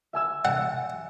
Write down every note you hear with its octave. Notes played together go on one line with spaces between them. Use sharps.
E5 G#5 E6
F#5